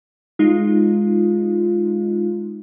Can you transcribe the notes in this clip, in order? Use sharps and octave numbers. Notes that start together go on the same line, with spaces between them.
G#3 D#4 F4